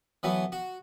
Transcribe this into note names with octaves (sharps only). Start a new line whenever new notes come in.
E3 F#3 A3 B3
F#4